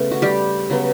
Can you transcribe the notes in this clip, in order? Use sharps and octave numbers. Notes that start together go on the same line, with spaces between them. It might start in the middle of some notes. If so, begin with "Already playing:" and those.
Already playing: C#3 A3 B3
F#4
G3 G4
C#3 F#3 B3